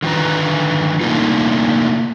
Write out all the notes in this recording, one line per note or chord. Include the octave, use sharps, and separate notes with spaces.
D3 D#3 F4 B4 A#5
C3 A3 A#3 D4 D#4 F4